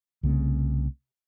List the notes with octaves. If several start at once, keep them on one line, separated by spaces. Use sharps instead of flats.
C2 C#3 A3 C4